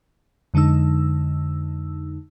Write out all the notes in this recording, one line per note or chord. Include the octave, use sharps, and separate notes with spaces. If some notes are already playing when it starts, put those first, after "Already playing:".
F2 D3 G#3 D#4 E6